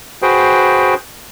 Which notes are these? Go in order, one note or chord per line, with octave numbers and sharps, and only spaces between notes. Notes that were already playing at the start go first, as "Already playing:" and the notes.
F#4 G#4 B4 C5 G5